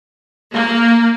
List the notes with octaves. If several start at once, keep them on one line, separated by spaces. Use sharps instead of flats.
A#3